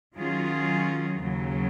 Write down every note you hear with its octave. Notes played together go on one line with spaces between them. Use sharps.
D#3 F#3 C#4 F4 G#4
D#2 C#3 F#3